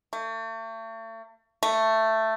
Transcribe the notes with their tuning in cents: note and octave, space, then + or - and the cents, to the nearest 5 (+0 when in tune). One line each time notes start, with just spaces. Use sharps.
A3 +40
A3 +10